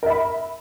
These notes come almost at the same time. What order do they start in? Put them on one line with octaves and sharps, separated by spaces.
A#4 E5 B5